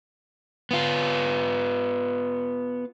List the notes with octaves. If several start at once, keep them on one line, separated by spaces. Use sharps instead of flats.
B3 F4